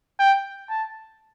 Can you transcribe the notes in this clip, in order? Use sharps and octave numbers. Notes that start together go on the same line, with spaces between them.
G5
A5